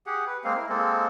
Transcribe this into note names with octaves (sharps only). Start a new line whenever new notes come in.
G4 G#4 F#5
B4
G#3 A#3 C4 F5
E4 A#4
G#3 A#3 C4 A4